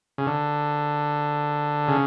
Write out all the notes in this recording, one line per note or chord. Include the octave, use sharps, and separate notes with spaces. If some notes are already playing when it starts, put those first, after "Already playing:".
C#3
D3
C#3